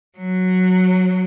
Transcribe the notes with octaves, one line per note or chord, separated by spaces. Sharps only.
F#3